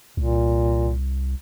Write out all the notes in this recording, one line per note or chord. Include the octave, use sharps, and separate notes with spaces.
C2 A#2